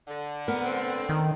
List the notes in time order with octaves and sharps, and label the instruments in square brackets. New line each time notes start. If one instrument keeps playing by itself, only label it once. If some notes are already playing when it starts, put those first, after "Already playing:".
[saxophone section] D3
[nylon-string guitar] B3 [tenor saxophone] A#4
[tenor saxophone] C4
[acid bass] D#3